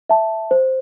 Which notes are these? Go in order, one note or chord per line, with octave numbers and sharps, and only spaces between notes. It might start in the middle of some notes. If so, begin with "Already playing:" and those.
E5 A5
C5